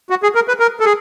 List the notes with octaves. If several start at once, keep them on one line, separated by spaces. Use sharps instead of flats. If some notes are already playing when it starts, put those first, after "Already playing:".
F#4
G#4
A#4
B4
A#4
A4
G#4